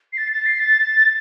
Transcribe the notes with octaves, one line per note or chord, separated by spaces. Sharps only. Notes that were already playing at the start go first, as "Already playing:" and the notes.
C7
A6
A6
C7
A6